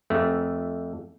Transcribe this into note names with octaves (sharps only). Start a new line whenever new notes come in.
F2 A3